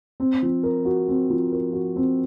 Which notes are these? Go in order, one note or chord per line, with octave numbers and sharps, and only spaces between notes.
C4
F3
A#4
F#4
C4
F3
A#4
F#4
C4